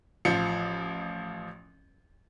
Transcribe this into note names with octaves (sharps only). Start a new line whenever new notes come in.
A1 F3 C#7